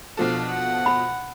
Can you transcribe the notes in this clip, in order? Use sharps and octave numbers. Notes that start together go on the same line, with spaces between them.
B2 F3 D4 A4 F5
F#5
B5